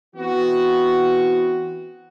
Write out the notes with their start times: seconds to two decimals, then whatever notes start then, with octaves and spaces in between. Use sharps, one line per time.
0.15 E3 B3 C4 E4 F#4